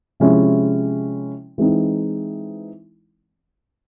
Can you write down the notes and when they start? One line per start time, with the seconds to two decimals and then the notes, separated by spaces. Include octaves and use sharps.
0.20 C3 F3 G#3 C#4 E4
1.58 E3 G#3 C4 D#4